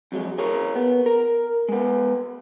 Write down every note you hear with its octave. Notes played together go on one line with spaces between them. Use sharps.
F2 F#3 G#3
G#4 A#4 C#5
B3
A#4
G#3 B3